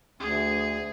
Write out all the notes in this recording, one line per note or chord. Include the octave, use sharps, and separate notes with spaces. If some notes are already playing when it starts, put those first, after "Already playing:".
D2 G#4